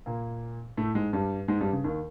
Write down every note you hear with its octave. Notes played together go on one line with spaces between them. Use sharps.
A#2 A#3
A2 A3
G#2 G#3
G2 G3
G#2 G#3
G2 G3
C#3
D#2 D#3